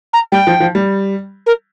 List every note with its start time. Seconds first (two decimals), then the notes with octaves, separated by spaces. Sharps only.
0.13 A#5
0.32 G3 G5
0.47 F3
0.60 F3
0.75 G3
1.46 A#4